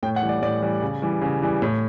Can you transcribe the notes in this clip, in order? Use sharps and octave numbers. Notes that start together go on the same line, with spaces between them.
A2 G5
F#5
E3 G3
D5
A2 D5
E3 G3
C#3
E3 G3
C#3
E3 G3
A2